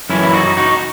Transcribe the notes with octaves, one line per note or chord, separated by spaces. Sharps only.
F#2 E3 C#4 E4
E4
D#4 F#4
D#4 F#4